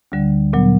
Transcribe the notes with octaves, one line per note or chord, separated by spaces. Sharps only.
D2 D3 G3
A#2 F#3 B3